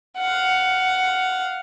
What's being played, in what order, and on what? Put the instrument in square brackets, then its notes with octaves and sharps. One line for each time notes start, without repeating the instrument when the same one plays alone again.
[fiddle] F5 F#5